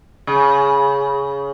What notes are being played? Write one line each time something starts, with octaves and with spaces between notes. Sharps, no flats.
C#3